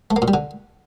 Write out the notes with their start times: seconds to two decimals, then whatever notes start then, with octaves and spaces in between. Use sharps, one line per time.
0.11 A3
0.16 A#3
0.22 A#2
0.28 G3
0.34 D3